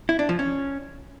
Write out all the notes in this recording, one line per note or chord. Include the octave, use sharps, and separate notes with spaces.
E4
D4
F3
C#4